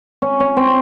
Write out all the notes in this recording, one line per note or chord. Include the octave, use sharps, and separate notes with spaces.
C#4
C#4
C4